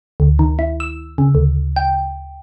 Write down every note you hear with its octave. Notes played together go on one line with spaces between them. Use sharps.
D2
D#3
E4
E6
C#3
D2
G5